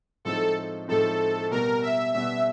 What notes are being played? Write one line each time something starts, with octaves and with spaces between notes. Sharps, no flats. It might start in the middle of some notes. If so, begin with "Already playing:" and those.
A2 F3 G#3 C4 D#4 A4
A2 F3 G#3 C4 D#4 A4
B2 G3 B3 A#4
E5
B2 G3 B3 E5